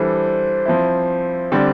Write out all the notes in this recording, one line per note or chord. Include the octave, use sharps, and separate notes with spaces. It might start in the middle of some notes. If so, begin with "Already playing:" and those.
Already playing: E3 G3 D4 A4 C5
F3 C4 E4
D3 G3 C4 D5